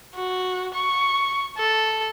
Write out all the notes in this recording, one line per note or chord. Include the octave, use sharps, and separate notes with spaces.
F#4
C#6
A4